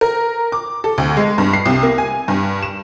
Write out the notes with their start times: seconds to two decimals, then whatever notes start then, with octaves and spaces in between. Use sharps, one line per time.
0.01 A#4
0.52 D6
0.84 A4
0.98 D2
1.17 G#3
1.38 G2
1.53 C7
1.66 C2
1.83 A#3
1.98 G#5
2.28 G2
2.63 E7